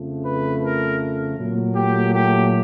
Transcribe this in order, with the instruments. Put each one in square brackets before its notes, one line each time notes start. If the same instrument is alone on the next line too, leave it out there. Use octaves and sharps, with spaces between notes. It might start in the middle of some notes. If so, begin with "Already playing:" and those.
Already playing: [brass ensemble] F2 C#3 F3 A3
B4
A#4
A#2 F#3 A3
G4
G4